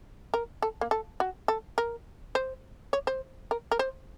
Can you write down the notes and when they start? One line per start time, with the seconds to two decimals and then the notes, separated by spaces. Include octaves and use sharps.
0.34 A#4
0.62 A4
0.81 A#3
0.91 A4
1.20 F#4
1.48 A4
1.78 A#4
2.35 C5
2.93 C#5
3.07 C5
3.51 A#4
3.72 A#4
3.79 C5